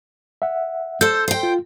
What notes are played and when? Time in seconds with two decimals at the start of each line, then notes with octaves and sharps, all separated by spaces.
0.42 E5 F#5
1.01 A4 C5 G6
1.28 C5 G5
1.43 F4